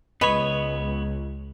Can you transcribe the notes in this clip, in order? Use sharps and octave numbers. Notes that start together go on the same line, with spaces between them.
C#2 B3 B4 C#5 D#5 B5